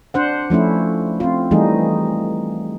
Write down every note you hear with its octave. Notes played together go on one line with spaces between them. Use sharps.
D4 C5 F#5
F3 A3 C#4 E4
C4 F4
E3 G3 A3 D#4 G#4